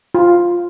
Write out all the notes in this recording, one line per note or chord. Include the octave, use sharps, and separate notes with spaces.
F4